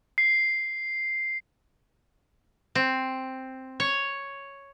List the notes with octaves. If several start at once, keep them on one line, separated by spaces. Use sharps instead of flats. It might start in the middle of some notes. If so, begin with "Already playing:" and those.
C7
C4
C#5